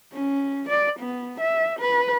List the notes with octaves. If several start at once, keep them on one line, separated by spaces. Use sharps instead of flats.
C#4
D5
B3
E5
B4